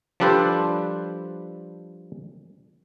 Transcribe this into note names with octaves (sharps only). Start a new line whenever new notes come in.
F3 G3 D4 A4 B4 C5